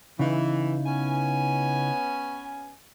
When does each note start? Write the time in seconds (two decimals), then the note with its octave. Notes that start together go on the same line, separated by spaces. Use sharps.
0.19 C#3 E3 D#4 E4
0.86 B3 C#4 G#5